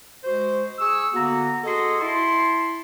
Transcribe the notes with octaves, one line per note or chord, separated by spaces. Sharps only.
G#3 F#4 C5
G#4 C#6 E6
D3 A#3 B3 F#4 A#5
F#4 G#4 A4 D#5 C6
E4 A5 C6